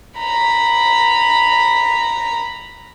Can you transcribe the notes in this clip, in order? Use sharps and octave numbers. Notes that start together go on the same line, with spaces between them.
A#5 B5